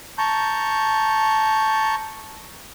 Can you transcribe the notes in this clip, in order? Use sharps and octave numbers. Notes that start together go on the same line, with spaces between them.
A5 A#5 C#6 G6